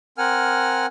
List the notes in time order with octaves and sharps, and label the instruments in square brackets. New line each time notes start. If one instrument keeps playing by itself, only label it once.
[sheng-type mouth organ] C4 A#4 F#5 G#5 F6